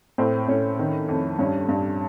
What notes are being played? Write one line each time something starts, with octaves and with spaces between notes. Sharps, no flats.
A2 C4
A2 C#4
D#3
F2
G2 C#4
G2